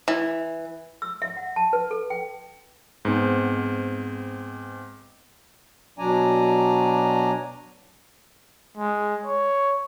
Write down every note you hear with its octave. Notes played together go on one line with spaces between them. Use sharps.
E3
E6
E5
F#5
A5
B4
A4
G5
G#2 B3 C4
B2 F#3 D4 D5 G#5 A#5
G#3
C#5